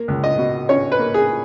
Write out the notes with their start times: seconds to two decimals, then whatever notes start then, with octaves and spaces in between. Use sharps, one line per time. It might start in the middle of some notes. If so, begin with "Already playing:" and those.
Already playing: A#3
0.08 C#2
0.24 D#5
0.38 B2
0.69 C#4 C#5
0.92 B4
0.99 A#3
1.14 G#4